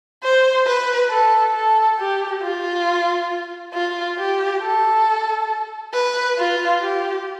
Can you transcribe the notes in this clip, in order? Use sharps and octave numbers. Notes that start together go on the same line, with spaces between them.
C5
B4
A4
A4
G4
F4
F4
G4
A4
B4
F4
G4